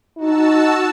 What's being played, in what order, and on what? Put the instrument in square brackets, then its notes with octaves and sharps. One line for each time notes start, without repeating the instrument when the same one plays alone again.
[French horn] D#4 [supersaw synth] F#4 A5 E6